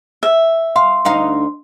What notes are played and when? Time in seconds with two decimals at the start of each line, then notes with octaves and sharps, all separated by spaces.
0.23 E5
0.76 F5 C6
1.05 D2 D#4 F5